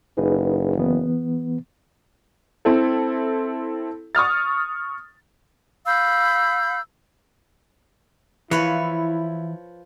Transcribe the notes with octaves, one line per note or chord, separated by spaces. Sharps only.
F#1 D#4 G#4 B4
E3 B3
C4 E4 A4
C#6 D#6 F6 A6
F5 B5 E6 G6
E3 F3 E4 B4 C#5